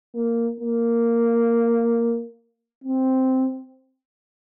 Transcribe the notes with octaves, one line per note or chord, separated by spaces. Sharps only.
A#3
A#3
C4